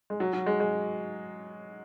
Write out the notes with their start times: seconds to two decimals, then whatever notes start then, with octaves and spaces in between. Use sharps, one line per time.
0.10 G#3
0.20 F#3
0.33 F#3
0.46 G#3
0.60 G#3